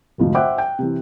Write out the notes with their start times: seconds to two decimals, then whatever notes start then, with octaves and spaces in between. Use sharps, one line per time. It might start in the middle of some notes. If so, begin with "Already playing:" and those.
0.18 F1 D2 G#2 F3
0.34 C5 E5 F#5 G5 D6 F#6
0.58 G5
0.79 C3 E3